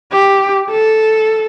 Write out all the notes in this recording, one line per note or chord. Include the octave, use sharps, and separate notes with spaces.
G4
A4